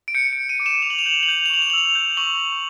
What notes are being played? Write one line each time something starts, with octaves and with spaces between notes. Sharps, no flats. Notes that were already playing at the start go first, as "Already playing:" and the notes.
D7
G6 C#7
G6 D7
D#7
D6
E7
D6 F7
F#7
F7
G6 F#7
F7
F#7
G6 F7
F#7
F7
C#6 F#7
F7
F#7
E6 F7
G6
C#6 F#7
C#6